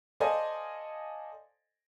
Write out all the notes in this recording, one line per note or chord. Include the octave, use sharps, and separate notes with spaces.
A4 C5 D5 D#5 F5 G#5